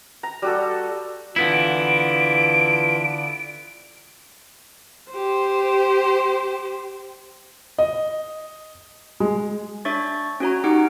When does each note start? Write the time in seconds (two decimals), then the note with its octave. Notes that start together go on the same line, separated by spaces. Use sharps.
0.23 A#5
0.42 G3 F#4 A4
1.36 D3 E3 B3 E4 F4 D7
5.12 G4 C5
7.78 D#5
9.20 G#3
9.85 D4 C#5 E5 C#6 A6
10.40 C#4 F#4 C#5 A#5
10.64 C#4 D#4 G4 F#5 G#5 D7